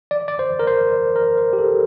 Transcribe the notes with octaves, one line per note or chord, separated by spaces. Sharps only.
D5
D5
C5
A#4
C5
A#4
C5
G4
A4